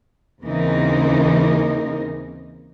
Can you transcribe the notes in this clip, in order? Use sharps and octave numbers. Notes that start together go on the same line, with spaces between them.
D#2 C#3 E3 C4 D#4 A#4